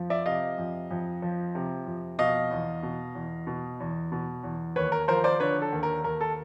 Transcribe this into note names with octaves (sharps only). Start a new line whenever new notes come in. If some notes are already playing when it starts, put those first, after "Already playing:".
Already playing: F2 F3
D5 E5
C3 D#5 F5
F2
F2
F3
C3
F2
B2 D#5 F5
E2
B2
E2
B2
E2
B2
E2
D#2 B4 C#5
A#4
F3 A#4 C5
C5 D5
D3 B4 C#5
A4
D#2
A#4
D#2 A#4
A4